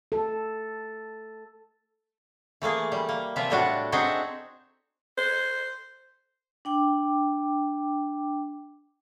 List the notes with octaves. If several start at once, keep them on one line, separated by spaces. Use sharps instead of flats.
A4
E3 A3 A#3 G#4
G3
A#3
C3 E3 F3 F4 D5 E5
A2 G3 D4 F#4
C4 D4 D#4 F#4 G#4 E5
C5
D4 G5 D6